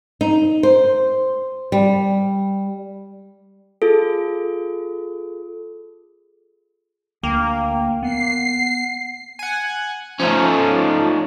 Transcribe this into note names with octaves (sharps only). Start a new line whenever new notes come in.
D#4
C5
G3
F4 G#4 A4
D2 A#3 G5
B3 F#5 C7
F#5 G#5
F3 A3 C#4 D#4